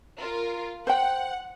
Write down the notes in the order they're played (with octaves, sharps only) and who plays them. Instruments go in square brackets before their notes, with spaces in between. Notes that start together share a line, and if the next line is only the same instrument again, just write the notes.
[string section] F4 A#4
[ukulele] C5 G5 [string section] F#5